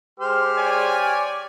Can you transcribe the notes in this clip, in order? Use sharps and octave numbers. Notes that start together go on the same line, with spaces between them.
G#3 G4 C5 F6
C#5 D5 G#5